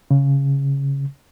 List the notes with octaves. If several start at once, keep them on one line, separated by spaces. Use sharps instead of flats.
C#3